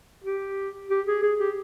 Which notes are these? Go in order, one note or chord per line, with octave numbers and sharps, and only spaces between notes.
G4
G4
G#4
G#4
G4